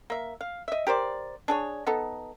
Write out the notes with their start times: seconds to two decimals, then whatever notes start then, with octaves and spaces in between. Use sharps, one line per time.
0.10 A#3 E5
0.41 F5
0.68 D#5 E5
0.87 G4 A#4 C5 D5
1.48 D4 G#4 C#5
1.86 B3 D#4 A4